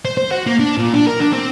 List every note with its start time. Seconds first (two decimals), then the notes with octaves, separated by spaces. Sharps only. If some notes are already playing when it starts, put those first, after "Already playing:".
0.05 C5
0.17 C5
0.31 F#4
0.46 A#3
0.59 D4
0.78 A#2
0.94 D4
1.07 A#4
1.20 D4
1.32 C4